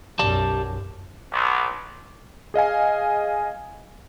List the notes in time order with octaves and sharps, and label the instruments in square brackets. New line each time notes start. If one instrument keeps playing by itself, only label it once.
[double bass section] B1 F#2 [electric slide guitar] G4 D5 A5
[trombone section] B1
[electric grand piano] G#4 D#5 F5 G#5